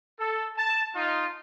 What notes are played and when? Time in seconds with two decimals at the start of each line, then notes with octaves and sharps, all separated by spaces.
0.20 A4
0.57 A5
0.95 D#4 F4